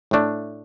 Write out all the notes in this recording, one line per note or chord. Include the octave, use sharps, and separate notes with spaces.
A2 A3 D4